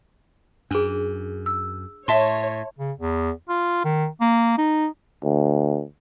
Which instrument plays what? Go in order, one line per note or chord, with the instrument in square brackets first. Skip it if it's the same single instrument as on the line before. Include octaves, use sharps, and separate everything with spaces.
[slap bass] F#2 [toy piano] D4 G#4
[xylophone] E6
[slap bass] A2 [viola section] C#5 [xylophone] E5 A5 C6
[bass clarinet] C#3
E2
F4
D#3
A#3
D#4
[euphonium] D2